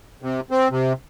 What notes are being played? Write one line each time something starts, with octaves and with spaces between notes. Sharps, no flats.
C3
C4
C3